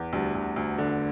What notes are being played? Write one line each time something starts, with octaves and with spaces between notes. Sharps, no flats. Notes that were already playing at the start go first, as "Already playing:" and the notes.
Already playing: E2
D2 G3
D2
D2
D3